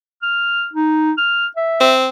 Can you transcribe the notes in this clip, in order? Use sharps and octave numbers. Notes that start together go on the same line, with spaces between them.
F6
D#4
F6
E5
C4